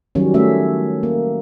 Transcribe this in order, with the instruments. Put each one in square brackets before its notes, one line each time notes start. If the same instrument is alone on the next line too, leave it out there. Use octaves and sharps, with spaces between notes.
[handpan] D#3 F#3 G3 C#4
A3 C#4 E5
A#3